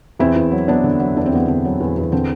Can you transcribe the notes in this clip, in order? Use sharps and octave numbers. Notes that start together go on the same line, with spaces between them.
E2 C4 E4
E2
F#3
F#3 B3 D4
D3
F#3
E2 D4
C4
E2 B3
D3 C4
F#3
E2
E2
D3 C4